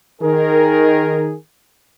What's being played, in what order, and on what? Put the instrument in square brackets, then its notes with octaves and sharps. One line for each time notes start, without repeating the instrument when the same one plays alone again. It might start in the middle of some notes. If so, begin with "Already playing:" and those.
[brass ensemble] D#3 G#4 A#4